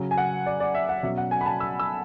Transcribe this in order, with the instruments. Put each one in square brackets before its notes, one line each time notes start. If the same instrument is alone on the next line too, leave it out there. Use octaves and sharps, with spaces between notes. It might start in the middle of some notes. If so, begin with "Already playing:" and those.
Already playing: [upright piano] C#3 F#3 C#4
G#5
F#5
D5
D5
E5
F#5
B2 F#3 C#4 E5
F#5
G#5
B5
A5
E6
E6